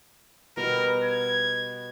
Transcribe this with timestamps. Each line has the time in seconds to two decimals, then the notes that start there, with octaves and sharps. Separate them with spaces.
0.57 B2 G3 A#4
1.04 G#6